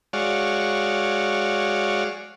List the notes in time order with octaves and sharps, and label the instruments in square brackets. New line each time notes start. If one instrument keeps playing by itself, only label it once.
[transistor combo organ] G#3 F#4 C#5 D5 F5